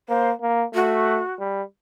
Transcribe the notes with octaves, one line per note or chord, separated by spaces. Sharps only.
A#3 C5
A#3
A3 F#4
G3